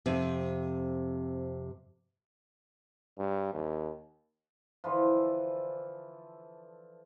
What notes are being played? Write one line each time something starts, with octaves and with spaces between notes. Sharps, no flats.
F2 C3
G2
D#2
D3 E3 F3